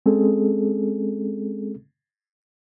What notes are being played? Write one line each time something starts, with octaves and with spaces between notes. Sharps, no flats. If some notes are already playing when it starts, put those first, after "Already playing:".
G#3 C4 C#4 G#4 A4